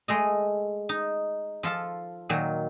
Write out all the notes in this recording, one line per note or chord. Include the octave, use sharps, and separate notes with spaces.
G#3 A3 D#5
D#4
F3 F4 A4 A5
A#2 D#3 F#3